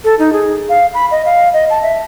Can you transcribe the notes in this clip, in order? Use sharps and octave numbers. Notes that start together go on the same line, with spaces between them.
A4
D#4
G#4
F5
B5
D#5
F5
D#5
A5
E5